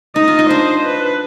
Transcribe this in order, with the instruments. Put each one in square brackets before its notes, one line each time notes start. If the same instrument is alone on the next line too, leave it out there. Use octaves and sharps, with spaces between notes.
[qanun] D#4 [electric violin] D#5
[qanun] F4
D#4
[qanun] D4 [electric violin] C5
[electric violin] B4